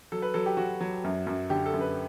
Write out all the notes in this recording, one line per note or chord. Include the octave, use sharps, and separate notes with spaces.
F#3 A4
B4
F#3 A4
G4
F#3 F#4
F#3
F#2
F#2
D3 G4
A4
F#2
B4